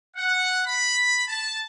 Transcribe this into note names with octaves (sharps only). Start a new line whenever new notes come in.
F#5
B5
A5